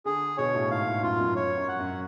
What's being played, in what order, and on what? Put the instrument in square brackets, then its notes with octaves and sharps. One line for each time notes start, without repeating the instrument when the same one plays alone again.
[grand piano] D3 [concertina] G#4
[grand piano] B2 [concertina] C#5
[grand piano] A2
[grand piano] G#2 [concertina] F5
[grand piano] A2
[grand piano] F#2 [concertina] F4
[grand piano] F#2
[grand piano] F#2 [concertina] C#5
[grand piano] F#2
[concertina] F#5
[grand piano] F#2